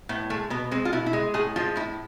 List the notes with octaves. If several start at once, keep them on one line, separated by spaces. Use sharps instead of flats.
A2 B3
G#3 A3
B2 B3
G#3 C4
F4
B2 E4
E4
G#3
A2 G#4
F3 G#3 F4
A2 E4